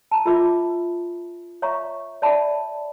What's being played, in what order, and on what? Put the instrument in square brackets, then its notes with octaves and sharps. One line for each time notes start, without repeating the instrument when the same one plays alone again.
[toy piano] A5 A#5
F4 A#4 E5 B5 D6
C#5 E5 F5 A#5 C#6
C#5 D5 E5 A5 B5